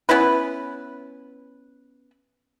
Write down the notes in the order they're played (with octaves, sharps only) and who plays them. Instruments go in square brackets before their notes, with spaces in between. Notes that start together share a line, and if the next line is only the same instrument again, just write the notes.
[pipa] B3 C#4 E4 B4